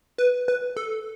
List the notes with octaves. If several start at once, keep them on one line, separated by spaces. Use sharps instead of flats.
B4
B4
A4